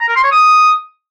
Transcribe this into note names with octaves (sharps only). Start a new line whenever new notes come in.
A#5
A#4
C6
C#5
D#6